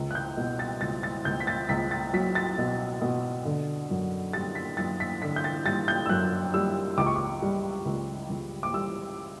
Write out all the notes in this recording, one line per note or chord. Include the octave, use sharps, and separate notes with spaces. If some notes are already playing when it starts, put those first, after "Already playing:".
Already playing: C#2
F#6
G6
B2
A6
C#2 A6
A6
C#2 G6
B6
A6
C#2 B6
A6
F#3 B6
A6
B2
B2
D3
F#2
G3 A6
B6
F#2 A6
B6
D3 B6
G6
A6
G3 A6
G6
E6
F#2 F#6
G3 E6
C#2 D6
C#6
D6
G3
C#2
C#2
D6
G3 E6